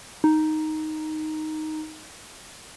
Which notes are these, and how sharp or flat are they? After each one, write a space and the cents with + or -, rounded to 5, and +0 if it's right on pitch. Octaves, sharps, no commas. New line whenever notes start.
D#4 +0